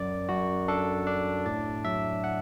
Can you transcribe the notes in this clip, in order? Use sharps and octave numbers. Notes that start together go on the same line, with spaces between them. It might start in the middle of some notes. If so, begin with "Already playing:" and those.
Already playing: F#2 D5
F#2 F#4
D4 A4
D4
A2 D5
F#3 E5
F#5